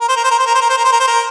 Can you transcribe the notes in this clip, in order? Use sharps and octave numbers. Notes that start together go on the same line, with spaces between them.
A#4
C5
A#4
C5
A#4
C5
A#4
C5
A#4
C5
A#4
C5
A#4
C5
A#4